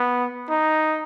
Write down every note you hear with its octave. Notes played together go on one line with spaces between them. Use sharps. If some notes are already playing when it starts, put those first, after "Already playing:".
Already playing: B3
D#4